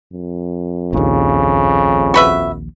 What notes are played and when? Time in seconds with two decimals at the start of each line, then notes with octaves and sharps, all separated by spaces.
0.13 F2
0.93 A#1 D#2 C#3
2.14 F#4 B4 E5